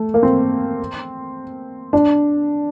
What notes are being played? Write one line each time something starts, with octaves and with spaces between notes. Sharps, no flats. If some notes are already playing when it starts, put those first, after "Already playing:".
Already playing: A3
A#3
C4
D4